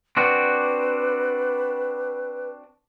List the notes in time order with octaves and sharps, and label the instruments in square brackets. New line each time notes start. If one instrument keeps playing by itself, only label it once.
[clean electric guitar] C4 D4 F#4 [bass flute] B4